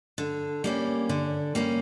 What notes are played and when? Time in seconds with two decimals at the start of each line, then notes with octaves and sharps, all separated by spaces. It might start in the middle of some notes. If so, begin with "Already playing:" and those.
0.18 D3
0.64 G3 A#3 C#4
1.09 D3
1.55 G3 A#3 C#4